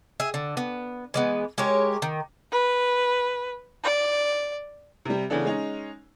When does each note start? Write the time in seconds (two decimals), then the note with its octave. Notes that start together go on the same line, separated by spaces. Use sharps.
0.20 G#4 E5
0.34 D3
0.57 B3
1.14 E3 G#3 B3
1.58 G#3 G4 A#4 C#5
2.02 D#3
2.52 B4
3.84 D5
5.05 C3 G3
5.30 C#3 E3 B3 D4 A4
5.45 G#3 C#4 D#4